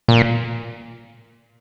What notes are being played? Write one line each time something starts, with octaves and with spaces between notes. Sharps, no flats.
A#2